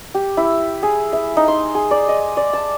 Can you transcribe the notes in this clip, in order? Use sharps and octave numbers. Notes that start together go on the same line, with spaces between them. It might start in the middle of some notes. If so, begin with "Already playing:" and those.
G4
E4
G#4
E5
D#4
C6
G#4
D5
D#5
D5
A5